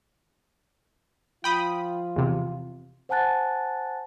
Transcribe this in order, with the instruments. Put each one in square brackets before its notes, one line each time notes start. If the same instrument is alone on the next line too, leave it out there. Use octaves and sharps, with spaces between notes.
[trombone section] F3 F4 [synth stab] G5 B5 D#6
[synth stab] E2 C3
[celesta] C5 F#5 G#5 A5 F#6 A6